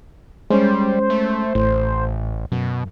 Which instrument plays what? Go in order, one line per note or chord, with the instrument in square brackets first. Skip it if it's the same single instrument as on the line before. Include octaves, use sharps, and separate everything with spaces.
[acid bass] G3 [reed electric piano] G#3 C#4 [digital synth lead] C5
[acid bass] A3
[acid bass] A1 [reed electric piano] A2
[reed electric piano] F#2 [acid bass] B2